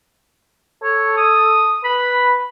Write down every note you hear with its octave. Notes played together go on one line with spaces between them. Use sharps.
A4 C#5
D#6
B4 B5